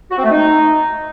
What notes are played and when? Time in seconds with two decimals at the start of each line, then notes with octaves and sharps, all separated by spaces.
0.10 F#4
0.17 C4
0.23 A3
0.30 D#4